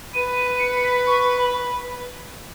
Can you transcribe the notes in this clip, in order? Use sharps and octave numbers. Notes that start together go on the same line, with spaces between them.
B4 D#7
D#7
C#7
B6
C#6
B5